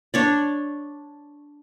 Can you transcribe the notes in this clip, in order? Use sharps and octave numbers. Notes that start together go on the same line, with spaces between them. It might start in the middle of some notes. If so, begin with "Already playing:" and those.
D4 C#5 D5